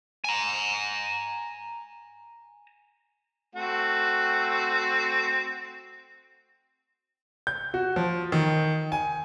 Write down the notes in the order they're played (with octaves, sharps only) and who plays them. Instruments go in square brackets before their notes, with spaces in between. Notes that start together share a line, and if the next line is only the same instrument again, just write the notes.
[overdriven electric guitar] G#5 A#5
[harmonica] A3 C4 F#4
[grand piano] G6
F#4
F3
D#3
G#5